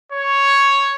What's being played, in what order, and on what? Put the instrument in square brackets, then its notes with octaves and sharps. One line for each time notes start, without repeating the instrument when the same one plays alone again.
[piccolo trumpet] C#5